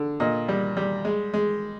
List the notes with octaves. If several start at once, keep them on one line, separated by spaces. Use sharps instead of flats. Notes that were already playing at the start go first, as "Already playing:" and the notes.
Already playing: D3
A#2 D#5
G3
G3
G#3
G#3